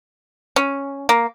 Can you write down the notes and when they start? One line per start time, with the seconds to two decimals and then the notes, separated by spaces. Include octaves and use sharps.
0.56 C#4
1.09 A#3